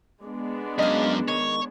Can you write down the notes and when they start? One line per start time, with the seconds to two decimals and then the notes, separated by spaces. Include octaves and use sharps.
0.23 G#3 B3 D4
0.79 F#2 A#4 D#5 F5
1.28 D#3 C#5